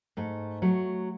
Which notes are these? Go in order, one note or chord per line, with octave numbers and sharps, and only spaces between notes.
G#2 A3
F#3 A3